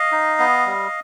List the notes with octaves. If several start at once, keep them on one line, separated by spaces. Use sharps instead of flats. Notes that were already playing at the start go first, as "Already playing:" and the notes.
Already playing: D#5 F5
D#4
B3
G3